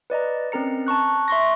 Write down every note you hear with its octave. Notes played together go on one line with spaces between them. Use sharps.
B4 D5 D#5 A#5
C4 C#4 A#4 A#5 C#7
A5 A#5 C#6 F#6
E5 C6 C#6 A#6